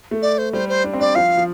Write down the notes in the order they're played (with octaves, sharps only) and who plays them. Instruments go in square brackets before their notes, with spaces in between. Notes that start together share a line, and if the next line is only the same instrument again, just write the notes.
[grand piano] A3
[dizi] D5
C5
[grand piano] G3 [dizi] C5
[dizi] C5
[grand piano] D4
C4
[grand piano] D4 [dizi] D5
[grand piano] F3 [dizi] F5
[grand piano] F3